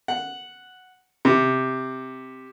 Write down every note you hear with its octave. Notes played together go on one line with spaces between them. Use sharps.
F#5
C3